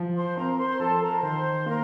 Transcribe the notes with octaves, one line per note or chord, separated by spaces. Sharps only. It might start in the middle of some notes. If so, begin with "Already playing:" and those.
Already playing: F3
C5 C6
C4 A#4 A#5
C5 C6
F3 A4 A5
A#4 A#5
A#5
D#3 C5 C6
A#3 A#4 A#5